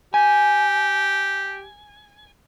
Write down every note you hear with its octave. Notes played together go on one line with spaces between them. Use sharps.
G4 G#5